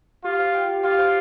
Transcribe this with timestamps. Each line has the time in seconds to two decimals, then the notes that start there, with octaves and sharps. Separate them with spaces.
0.24 F4 G4
0.39 C5
0.55 G5
0.69 G4
0.84 F4 G4
0.99 C5